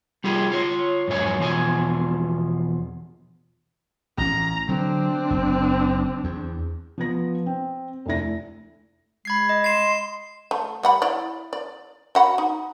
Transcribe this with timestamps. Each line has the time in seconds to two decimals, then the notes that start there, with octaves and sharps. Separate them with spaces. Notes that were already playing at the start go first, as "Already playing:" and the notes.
0.24 G3 F4 G4 G#4
0.52 F4 C#5
1.08 F2 G#2 F#3 C#5 G#5
1.39 E2 B2 F3 F4 G#5
4.18 A1 C#4 A#5
4.69 D3 F#3 C4 D4
5.30 F#1
6.24 E2
6.98 F3 B3 A#6
7.46 C4
8.05 F1 D2 E4 A#6
9.25 G#3 B5 G#6 C7
9.49 D#5
9.64 C6 C7 E7
10.51 A3
10.83 G3 F#5 B5
11.02 E4 D5
11.53 D5
12.15 F#4 F#5 B5
12.38 D#4